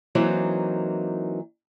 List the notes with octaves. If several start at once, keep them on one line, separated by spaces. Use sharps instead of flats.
E3 F#3 A#3 C4 D#4